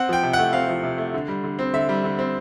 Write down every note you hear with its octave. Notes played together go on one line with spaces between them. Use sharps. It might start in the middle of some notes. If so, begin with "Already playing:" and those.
Already playing: C4 F#5
F3 G5
C3
F#5
A3
C4 F5
F3
C3
A3
D3
G3
D3
C4
D3 E5
G3
D3
C4